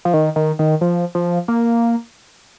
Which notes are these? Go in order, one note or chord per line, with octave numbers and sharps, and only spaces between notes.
F3
D#3
D#3
D#3
F3
F3
A#3